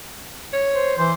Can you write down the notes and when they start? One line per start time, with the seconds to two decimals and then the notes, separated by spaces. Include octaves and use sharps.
0.53 C#5
0.74 C5
0.98 E3 C5